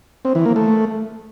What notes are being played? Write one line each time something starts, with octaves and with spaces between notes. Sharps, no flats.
C4
E3
A#3
A3